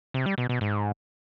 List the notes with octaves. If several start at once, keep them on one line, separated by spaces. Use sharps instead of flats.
C3
G3
B2
B2
G#2